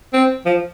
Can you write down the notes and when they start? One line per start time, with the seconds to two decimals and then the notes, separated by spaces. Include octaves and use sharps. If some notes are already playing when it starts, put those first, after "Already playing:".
0.13 C4
0.46 F3